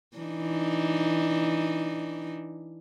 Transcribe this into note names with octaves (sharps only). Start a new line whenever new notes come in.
E3 D4 D#4